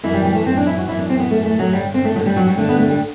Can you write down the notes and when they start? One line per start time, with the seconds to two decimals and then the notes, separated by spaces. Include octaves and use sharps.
0.03 F#2 E3 E4
0.14 G3
0.24 G3
0.35 A3
0.45 F#2 C4
0.51 E3
0.57 D4
0.67 E4
0.78 F#4
0.88 F#2 E3 E4
0.99 D4
1.09 C4
1.19 B3
1.30 F#2 E3 A3
1.45 A3
1.59 F#3
1.73 G2 D3 G3
1.94 C4
2.04 A3
2.15 G2 F#3
2.19 D3
2.26 G3
2.36 F#3
2.47 G3
2.57 G2 D3 A3
2.69 B3
2.79 A3
2.90 G3